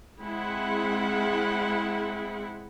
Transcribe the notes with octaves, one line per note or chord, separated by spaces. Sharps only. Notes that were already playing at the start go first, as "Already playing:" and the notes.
G#3 C4 E4 G#4 F#5